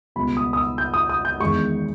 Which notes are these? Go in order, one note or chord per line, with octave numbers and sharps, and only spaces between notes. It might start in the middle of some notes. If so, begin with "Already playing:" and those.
C#2 B2 G3 B5
D#6
D#6
E6
G6
D#6
D#6
G6
E2 D#3 G#3 C#6